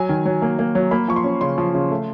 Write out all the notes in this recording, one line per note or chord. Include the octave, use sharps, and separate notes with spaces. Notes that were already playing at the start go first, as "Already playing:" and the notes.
Already playing: F#3 G#5
D#3
F#3
A#3
A#3
F#3
A#3 B5
F3 C#6
C6
C#4
C#3 C6
F3
C#3
A3